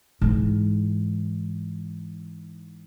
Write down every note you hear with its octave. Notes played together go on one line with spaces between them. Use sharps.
G#2 E3